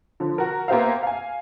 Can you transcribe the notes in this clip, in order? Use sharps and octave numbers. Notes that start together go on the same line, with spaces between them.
D3 F3
F#4 A#4
A#3 B3 G4 C5 E5 F5
F5 G#5